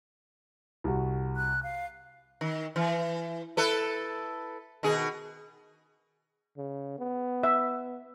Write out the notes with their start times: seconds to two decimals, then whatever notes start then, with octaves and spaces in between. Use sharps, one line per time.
0.84 C2 F#4
1.36 F#6
1.63 F5
2.41 D#3
2.76 E3
3.57 E4 A4 B4
4.83 B2 D#3 G#4
6.57 C#3
6.99 B3
7.43 E5